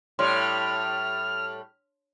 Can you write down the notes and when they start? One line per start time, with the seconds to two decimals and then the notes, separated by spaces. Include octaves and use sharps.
0.19 A2 G3 D4 C#5 C6 F6